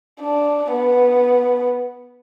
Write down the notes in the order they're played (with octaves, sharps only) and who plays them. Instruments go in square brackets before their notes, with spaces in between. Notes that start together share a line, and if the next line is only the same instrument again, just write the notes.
[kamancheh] D4
B3